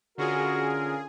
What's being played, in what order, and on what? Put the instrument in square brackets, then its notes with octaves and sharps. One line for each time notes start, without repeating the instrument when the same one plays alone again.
[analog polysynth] D3 C#4 F4 [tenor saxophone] F#4 [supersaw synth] G#4 [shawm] A#4